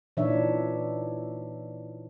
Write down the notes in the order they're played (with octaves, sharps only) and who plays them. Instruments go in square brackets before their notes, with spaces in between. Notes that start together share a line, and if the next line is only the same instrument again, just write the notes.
[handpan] A#2 E3 D4 D#4 C#5 E5